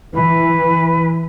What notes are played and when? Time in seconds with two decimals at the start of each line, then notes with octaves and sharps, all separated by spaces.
0.14 E3 B4